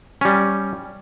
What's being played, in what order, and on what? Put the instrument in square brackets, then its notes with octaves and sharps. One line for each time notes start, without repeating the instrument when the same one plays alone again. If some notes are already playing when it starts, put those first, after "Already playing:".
[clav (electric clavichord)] G3 C#4